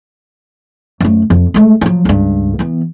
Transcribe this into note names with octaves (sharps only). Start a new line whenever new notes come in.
F#2 A3
F2
G#3 A3
F3 F#3
C#2 G2
E3 B3